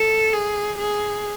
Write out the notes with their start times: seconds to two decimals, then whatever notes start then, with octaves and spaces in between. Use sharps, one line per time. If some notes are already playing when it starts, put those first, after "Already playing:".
Already playing: A4
0.33 G#4
0.79 G#4